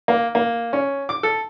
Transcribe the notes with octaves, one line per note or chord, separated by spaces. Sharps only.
A#3
A#3
C#4
D6
A4